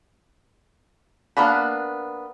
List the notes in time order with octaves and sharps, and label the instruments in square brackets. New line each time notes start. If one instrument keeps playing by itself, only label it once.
[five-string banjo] A#3 B3 D4 B4